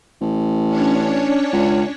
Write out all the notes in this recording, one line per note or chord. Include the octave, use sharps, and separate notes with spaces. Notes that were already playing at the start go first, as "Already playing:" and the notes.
A1
C#4 D4 C#5
C#2